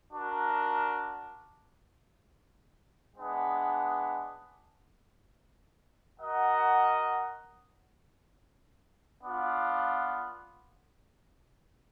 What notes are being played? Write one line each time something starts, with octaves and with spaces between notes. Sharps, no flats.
D4 F#4 A#4
G#3 B3 D4
F#4 A#4 D#5 F#5
B3 D4 F4